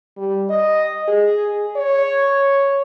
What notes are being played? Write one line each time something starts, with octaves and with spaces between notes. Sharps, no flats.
G3
D#5
G#4
C#5